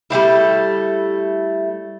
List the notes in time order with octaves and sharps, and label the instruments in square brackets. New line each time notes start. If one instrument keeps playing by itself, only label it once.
[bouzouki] G3 A3 C4 E4